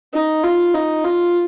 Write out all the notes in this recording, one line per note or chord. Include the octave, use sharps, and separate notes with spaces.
D#4
F4
D#4
F4